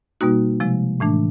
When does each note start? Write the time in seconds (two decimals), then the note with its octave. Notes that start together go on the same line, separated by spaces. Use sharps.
0.21 B2 G3 A#3 D#4 F#4
0.60 C3 F3 G#3
1.00 A2 E3 A3 D4